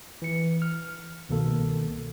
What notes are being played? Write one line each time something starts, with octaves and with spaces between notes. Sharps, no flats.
E3 C#7
F6
C2 B2 D#3 A#3 A4